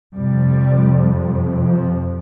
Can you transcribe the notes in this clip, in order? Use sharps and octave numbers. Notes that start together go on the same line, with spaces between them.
F2 C3 G3
F3